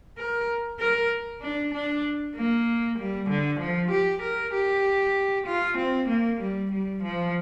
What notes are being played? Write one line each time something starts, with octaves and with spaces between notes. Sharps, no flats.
A#4
A#4
D4
D4
A#3
G3
D3
F3
G4
A#4
G4
F4
C4
A#3
G3
G3
F3